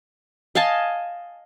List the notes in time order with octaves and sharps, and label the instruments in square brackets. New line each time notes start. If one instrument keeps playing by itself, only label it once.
[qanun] D#5 F5 G#5 A5